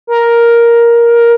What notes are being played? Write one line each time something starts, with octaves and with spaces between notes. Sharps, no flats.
A#4